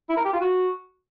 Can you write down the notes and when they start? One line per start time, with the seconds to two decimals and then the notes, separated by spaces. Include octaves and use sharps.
0.09 E4
0.17 A#4
0.25 G4
0.33 F4
0.41 F#4